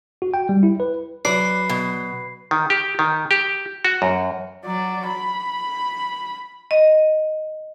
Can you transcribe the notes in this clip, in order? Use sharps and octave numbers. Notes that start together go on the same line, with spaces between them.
F#4
G5
G3
E4
B4
F#3 B4 D5 C7
B2
D#3
G4
D#3
G4
F#4
F#2
F#3 D5
B5
D#5